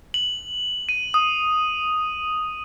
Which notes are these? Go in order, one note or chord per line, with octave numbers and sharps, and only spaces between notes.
F#7
D#7
D#6